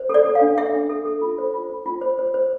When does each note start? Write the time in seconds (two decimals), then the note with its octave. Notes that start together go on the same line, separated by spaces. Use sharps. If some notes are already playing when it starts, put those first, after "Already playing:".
Already playing: C5
0.09 A4 D5
0.25 A4
0.35 F5
0.41 D4
0.57 A4 E5
0.74 D4
0.89 A4
1.05 A4
1.21 F4
1.38 C5
1.54 F4
1.70 C5
1.86 F4
2.01 C5
2.19 C5
2.34 C5